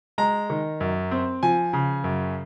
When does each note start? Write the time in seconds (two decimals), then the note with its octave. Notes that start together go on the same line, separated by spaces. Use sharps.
0.18 G#3 A#5
0.50 D#3
0.81 F#2
1.11 C4
1.43 F3 G#5
1.73 C#3
2.04 F#2